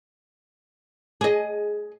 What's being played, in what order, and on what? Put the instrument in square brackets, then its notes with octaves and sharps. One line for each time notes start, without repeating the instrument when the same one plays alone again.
[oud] G#4 D#5